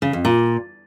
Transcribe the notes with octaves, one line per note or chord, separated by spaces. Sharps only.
C#3
F2
A#2